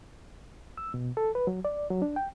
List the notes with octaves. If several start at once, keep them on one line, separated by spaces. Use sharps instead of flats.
E6
B2
A4
B4
F#3
D5
F#3
D4
G5